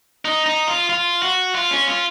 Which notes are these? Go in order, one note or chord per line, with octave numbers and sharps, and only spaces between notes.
D#4
D#4
F4
F4
F#4
F4
C#4
F4